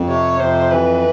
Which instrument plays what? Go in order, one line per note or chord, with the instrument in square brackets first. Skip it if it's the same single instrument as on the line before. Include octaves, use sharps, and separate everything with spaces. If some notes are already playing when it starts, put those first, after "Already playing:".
Already playing: [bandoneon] F2
[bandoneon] C3 [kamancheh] C#5
[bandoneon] F2 [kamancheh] C5
[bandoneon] E3 [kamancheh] B4